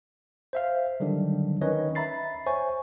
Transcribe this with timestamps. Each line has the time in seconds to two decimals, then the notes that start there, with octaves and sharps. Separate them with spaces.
0.53 C5 E5 F5
1.00 D3 D#3 F#3 G3 D4
1.61 D#3 C#4 B4 C#5 D#5
1.95 E5 A#5 B5 A6 C7
2.46 C5 C#5 E5 G#5 C#6